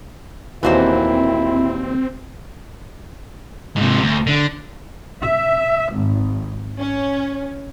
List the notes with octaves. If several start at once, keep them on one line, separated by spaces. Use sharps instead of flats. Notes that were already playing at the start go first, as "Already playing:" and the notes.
D#2 A#2 E3 B3 C4 E4 F#4 C5
G#2 C3
D2
D3
E5
G#1
C#4